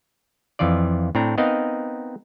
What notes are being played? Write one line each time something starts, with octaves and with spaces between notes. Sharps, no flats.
F2 E3 F3 F4 D5
A2 C4 D4 A#5
B3 C4 D#4 A#4 D#5 F5